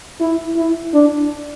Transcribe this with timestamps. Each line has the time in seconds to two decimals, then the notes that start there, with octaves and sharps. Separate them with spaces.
0.20 E4
0.57 E4
0.94 D4